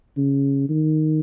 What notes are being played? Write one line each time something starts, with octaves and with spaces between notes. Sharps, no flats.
C#3
D#3